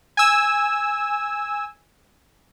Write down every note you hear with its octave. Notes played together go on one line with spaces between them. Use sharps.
G#5 E6